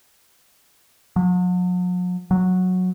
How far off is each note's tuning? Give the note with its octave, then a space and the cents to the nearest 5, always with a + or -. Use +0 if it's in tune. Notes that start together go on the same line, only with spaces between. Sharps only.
F#3 -45
F#3 -10